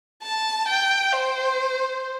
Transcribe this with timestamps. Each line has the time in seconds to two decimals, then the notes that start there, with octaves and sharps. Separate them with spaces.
0.23 A5
0.68 G5
1.13 C5